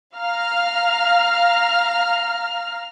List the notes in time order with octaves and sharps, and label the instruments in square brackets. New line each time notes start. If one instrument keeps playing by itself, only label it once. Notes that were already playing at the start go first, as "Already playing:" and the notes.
[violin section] F5 A#5 F6